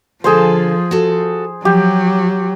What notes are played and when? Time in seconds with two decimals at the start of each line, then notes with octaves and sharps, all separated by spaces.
0.24 D3 F3 G#4 A4 C5 F5
0.91 F#4 A4
1.65 F3 F#3 G4